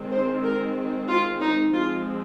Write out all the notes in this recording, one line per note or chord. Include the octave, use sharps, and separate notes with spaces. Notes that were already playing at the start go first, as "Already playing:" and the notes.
Already playing: D#3 G#3 C4
C5
A#4
F4
D#4
F3 G#3 C4 F4